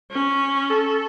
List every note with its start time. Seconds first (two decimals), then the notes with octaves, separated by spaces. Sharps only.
0.11 C#4
0.70 A4